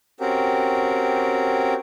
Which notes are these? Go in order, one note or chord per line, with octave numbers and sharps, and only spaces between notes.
C4 C#4 F#4 G4 A#4